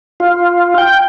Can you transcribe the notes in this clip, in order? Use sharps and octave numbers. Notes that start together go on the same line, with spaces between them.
F4
G5